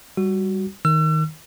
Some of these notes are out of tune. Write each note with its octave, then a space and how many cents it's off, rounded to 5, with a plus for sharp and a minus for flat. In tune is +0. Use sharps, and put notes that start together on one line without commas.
G3 +0 F#4 +5
D#3 +0 E6 +40